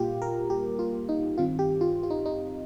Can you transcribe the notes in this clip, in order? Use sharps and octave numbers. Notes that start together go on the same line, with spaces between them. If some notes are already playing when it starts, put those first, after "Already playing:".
Already playing: A#2 G3 A#3 F4 G4
A#4
G4
F4
D#4
G2 D#3 C4 F4
G4
F4
F4
D#4
D#4